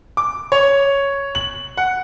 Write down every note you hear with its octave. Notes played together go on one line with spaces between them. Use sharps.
D6
C#5
F#7
F#5